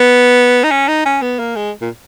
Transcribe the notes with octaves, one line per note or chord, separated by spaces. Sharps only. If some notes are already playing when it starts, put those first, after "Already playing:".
Already playing: B3
D#4
C#4
D#4
C#4
B3
A#3
G#3
A#2